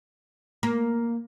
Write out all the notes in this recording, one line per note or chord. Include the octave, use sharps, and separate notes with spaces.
A#3